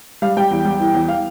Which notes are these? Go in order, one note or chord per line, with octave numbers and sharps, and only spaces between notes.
G3 F5
G3 G5
E2
G3
E3
E2
F5